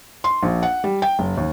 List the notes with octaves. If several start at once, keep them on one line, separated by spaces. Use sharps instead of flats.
C6
A#1
F#5
G3
G5
F#1
D#2